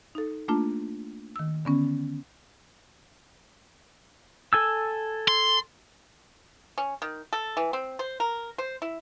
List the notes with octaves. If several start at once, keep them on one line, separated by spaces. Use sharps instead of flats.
D#4 A4
A3 A#3 D4 F4 A5
D#3 E6
D3 B3 C#4
A4 G#5 E6
C6
C#4
D#3
A4
E3
C4
C5
A#4
C5
E4